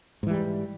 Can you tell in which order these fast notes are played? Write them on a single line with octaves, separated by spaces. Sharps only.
G#2 E3 G3